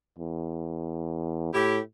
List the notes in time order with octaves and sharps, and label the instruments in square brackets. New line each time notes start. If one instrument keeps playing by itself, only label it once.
[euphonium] E2
[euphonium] A2 [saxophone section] E4 G4